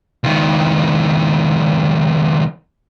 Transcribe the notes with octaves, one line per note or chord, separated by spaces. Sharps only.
C#2 D#3